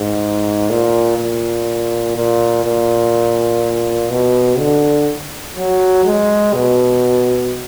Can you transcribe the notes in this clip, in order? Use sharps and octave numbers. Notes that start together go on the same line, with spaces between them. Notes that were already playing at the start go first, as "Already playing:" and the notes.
Already playing: G#2
A#2
A#2
A#2
A#2
B2
D3
F#3
G#3
B2